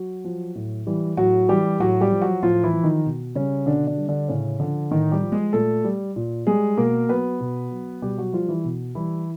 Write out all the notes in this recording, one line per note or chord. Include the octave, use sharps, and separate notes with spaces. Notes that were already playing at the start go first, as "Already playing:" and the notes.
Already playing: F#3 F#4
F3
A2
E3 G3
A2 F#3 F#4
E3 G3 G4
A2 F#3 F#4
G3 G4
F3
F#3 F#4
A2 F3 F4
E3 E4
F3
D#3 D#4
B2
C#3 G3 C#4
B2 D3 D4
D3 D4
G3
D3 D4
A2 C#3 C#4
D3 F3 D4
A2 D#3 D#4
G3 G4
F3
G#3 G#4
A#2 A3 A4
G3
A#2
G3 G#3 G#4
B2 A#3 A#4
F#3 B3 B4
B2
F#3
B2 G3 G4
F#3 F#4
F3 G3 F4
E3 E4
B2
E3 G3 E4